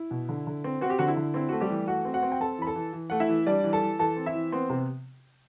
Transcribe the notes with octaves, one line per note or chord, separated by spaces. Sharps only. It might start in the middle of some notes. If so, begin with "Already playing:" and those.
Already playing: E4
B2
D3
D3
C4
C4 F#4
G4
D3 F#4
E4
D3
C4 E4
A3 F#4
G3 G4
E3
A3 F#4 F#5
C4
F#4 F#5
C4
G5
C4 A4 A5
E3 B5
A4 A5
E3
E3
A3 F#5
E4 E5
E3
G3 D4 D5
E3
A4 A5
E3
E3 A4 A5
C4
E4 E5
E3
B3 C4 C5
C3